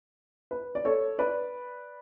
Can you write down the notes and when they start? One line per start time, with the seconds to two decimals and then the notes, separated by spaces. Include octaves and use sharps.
0.51 B4
0.75 D5
0.85 A4 C#5
1.19 B4 D5